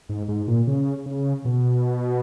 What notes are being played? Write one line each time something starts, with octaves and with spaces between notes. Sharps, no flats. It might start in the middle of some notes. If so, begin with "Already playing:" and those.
G#2
G#2
A#2
C#3
C#3
B2